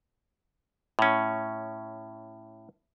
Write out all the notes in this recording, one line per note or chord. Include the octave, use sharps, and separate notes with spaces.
A2 C#4